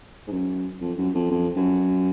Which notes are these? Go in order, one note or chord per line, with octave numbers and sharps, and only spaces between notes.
G#2
F#2
F2
F#2
F2
F2
F#2